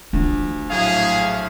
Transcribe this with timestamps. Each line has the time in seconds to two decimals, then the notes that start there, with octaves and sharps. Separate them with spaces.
0.13 D2 D4 F4
0.70 A#1 A2 F#3 G#4 F5